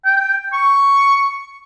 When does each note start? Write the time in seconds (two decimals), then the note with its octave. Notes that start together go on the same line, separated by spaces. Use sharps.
0.05 G5
0.53 C#6